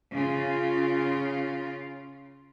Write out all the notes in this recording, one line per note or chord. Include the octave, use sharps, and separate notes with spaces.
C#3 F4